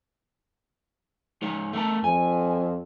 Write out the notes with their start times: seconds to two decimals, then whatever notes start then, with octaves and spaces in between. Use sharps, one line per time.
1.42 G#3 D#4 C#5
1.73 A3 A#4 A5
2.04 F2 G#5